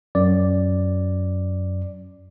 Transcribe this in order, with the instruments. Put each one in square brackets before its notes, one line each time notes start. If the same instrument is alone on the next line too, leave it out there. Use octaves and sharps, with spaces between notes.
[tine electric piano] F#2 D5